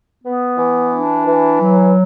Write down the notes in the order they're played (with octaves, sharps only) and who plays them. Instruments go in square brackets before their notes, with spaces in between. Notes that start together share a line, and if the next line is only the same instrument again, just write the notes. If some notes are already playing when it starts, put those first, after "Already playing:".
[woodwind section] B3
E3
D4
E3
F#3